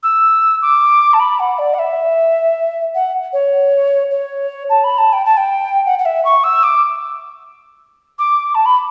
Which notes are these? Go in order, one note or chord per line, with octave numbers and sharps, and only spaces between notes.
E6
D6
A5
B5
F#5
D5
F#5
E5
F#5
C#5
C#5
A5
B5
A5
G5
A5
G5
F#5
F#5
E5
C#6
E6
D6
D6
A5
B5